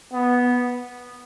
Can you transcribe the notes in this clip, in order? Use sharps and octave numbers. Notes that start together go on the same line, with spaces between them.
B3